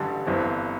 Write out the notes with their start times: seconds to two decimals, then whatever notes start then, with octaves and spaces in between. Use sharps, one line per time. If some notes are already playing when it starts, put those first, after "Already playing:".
Already playing: A1 G2 D3 G3
0.26 G1 G2 E3 C4